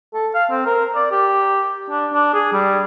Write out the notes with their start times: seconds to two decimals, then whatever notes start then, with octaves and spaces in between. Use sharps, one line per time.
0.14 A4
0.34 F5
0.51 C4
0.66 A#4
0.95 D5
1.12 G4
1.90 D4
2.13 D4
2.34 G#4
2.53 G3